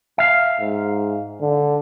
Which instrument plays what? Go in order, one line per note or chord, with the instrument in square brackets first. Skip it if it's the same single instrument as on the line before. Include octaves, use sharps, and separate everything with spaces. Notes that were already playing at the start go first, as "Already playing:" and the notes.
[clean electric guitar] E5 F5
[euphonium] G#2
D3